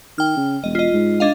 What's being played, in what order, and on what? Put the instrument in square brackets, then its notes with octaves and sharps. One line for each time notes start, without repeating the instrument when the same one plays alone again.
[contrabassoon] D#3 [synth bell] G5 F6
[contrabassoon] C#3
[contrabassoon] E1 [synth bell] D#5
[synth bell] F4 D#5
[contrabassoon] G#2
[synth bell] D4 D#5 F5